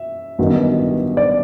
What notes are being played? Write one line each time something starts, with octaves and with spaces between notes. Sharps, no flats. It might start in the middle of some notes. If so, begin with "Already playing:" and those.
Already playing: E5
A1 G2 D#3 F#3 B3
D5